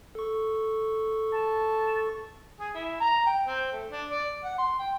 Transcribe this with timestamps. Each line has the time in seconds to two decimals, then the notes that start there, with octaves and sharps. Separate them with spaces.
0.15 A4 C#6
1.33 A5
2.60 G#4
2.75 E4
3.01 A#5
3.27 G5
3.46 C4
3.72 A3
3.90 D4
4.11 D5
4.44 F#5
4.58 C6
4.79 G5